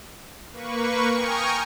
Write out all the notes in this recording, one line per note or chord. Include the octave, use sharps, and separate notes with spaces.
A#3 B4 C#6
G5 G#5 A#5 C#6 D#6 F6